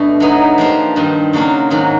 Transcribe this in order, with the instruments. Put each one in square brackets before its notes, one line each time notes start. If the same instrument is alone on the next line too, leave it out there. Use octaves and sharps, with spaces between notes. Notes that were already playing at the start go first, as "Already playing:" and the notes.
Already playing: [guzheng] B2 A3 D4
F#3 B3 D#4
F3 A#3 D4 G4 C5
G2 D#3 G3
C#3 F#3 A#3 D4 F4
G#2 D#3 F#3